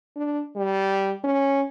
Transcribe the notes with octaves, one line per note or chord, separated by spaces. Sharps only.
D4
G3
C#4